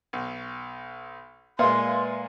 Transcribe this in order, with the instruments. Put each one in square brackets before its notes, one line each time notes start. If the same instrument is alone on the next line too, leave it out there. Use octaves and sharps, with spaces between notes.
[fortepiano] B1
[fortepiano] A#2 G#3 [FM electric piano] B4 E5 F5 [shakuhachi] C6